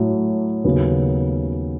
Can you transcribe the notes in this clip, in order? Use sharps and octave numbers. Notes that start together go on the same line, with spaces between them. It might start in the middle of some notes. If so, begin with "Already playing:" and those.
Already playing: A2 F#3 A3
D#2 C#3 F#3 B3